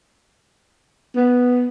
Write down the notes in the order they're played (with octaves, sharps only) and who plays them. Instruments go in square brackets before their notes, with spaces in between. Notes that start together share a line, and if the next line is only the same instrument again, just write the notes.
[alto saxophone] B3